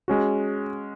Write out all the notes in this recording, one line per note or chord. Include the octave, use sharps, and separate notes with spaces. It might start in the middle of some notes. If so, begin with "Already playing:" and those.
G#3 C#4 F#4